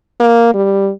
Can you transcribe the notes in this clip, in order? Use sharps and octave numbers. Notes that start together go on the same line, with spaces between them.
A#3
G3